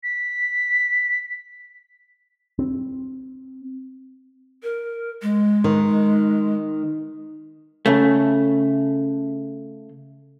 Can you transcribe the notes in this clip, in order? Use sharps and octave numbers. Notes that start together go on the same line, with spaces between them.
B6
C4
A#4
G#3
D#3
C#3 A3